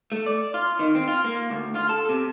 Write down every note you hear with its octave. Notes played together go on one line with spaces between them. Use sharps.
A3
D5
F4
D#3
C4
F4
A#3
D2
F4
A4
C3